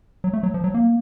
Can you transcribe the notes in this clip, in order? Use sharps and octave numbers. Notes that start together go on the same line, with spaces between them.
F#3
A3
F#3
F3
F#3
A#3